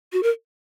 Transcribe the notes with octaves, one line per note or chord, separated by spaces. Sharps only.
F#4
A#4